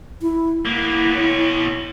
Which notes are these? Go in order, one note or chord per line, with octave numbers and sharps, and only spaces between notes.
E4
A#3 B3 E4
B2 C#5